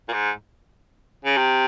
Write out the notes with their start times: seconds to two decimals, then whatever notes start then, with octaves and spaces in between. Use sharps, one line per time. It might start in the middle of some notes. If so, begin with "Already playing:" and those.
0.09 A#2
0.13 G#2
1.25 C#3
1.37 C3